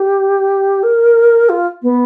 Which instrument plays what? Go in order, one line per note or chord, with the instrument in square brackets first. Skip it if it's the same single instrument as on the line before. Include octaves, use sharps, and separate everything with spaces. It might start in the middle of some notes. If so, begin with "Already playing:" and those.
Already playing: [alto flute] G4
A#4
F4
B3